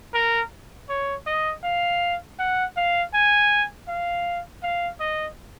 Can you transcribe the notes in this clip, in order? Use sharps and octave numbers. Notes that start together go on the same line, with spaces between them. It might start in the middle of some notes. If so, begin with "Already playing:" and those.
A#4
C#5
D#5
F5
F#5
F5
G#5
F5
F5
D#5